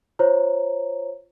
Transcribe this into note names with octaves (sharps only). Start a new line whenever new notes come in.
F4 C5 C#5 A#5